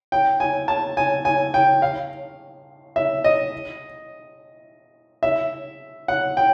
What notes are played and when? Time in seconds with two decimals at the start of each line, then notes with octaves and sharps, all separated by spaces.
0.12 G5
0.40 G#5
0.68 A5
0.97 G#5
1.25 G#5
1.54 G5
1.82 F5
2.96 E5
3.24 D#5
5.23 E5
6.08 F#5
6.37 G5